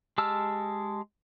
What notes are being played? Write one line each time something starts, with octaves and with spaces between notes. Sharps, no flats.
G#3 G4 A5 E6 F6